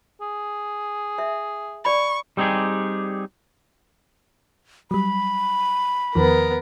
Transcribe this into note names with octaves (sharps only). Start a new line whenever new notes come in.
G#4
E5
D5 B5 C#6
G3 C4 D#4 G4 G#4
F#3 G3 B5
E2 D#3 F3 B3 A#4